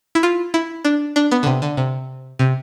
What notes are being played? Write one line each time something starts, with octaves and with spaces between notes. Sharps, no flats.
E4
F4
E4
D4
D4
B3
D3
C3
D3
C3
C3